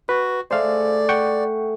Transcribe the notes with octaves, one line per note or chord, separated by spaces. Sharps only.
F#4 B4
A3 G#4 C5 D5 F5
F#5 G5 C#6